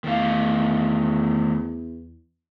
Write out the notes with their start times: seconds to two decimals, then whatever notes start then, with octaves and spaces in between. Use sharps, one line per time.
0.04 E2 D#3 A3 F5